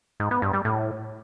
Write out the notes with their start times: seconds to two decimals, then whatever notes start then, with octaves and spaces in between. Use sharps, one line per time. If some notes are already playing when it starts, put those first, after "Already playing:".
0.20 G#2
0.31 B3
0.42 G2
0.53 G3
0.65 A2